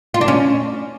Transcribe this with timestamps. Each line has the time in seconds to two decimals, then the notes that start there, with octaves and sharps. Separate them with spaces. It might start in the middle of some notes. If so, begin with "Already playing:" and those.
0.14 F4
0.21 D4
0.28 C#4